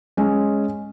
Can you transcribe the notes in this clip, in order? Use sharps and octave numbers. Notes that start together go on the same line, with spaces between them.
G#3 C#4